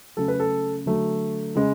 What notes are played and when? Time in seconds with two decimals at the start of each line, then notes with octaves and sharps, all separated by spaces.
0.17 C#3 F#3 A3 A4
0.28 B4
0.40 A4
0.86 D3 F#3 A3
1.55 C#3 G#3